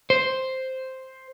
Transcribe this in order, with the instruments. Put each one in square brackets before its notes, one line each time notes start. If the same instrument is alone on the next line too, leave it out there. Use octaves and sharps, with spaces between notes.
[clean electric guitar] C5